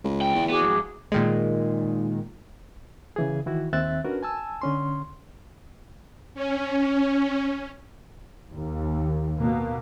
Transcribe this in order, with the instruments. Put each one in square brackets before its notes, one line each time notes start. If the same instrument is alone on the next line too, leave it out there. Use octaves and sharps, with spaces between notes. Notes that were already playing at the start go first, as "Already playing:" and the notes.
[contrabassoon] C#2
[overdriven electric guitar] D2 G5
[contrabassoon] E2
[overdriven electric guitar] B3 [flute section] F#4 G#4 D6
[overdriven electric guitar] F2 G#2
[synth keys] A#2 D#3 G#3
[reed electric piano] C#3 E3 G#4
D#3 E3 E4 F#4
D#2 D#3 C4 E5 F#6 A6
C#4 D4 F#4 A#4 B4
G#5 A5 E6
D3 C#4 C6
[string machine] C#4
[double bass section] D#2
B2 A#3